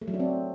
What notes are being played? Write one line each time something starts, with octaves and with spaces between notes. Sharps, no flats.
A3
F#3
D4
C4